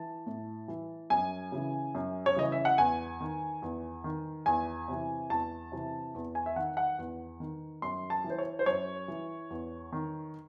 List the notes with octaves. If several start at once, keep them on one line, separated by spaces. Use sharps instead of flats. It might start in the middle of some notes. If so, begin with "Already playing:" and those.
Already playing: E3 A5
A2
E3
F#2 G#5
C#3 E3
F#2
C#5
C#3 E3 D#5
E5
F#5
E2 G#5
D#3
E2
D#3
E2 G#5
C3 E3
E2 A5
C3 E3
E2
G#5
E5
D#3 F#5
F#5
E2
D#3
F#2 C6
A5
E3
C5
C#5
C5
F#2 C#5
E3
E2
D#3